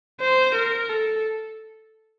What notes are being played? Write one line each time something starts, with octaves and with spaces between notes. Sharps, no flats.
C5
A#4
A4